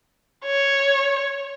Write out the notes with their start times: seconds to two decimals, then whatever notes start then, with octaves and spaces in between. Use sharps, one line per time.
0.45 C#5